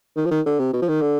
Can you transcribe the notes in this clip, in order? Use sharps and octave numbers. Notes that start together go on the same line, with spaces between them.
D#3
F3
D#3
D3
C3
B2
F3
D#3
D3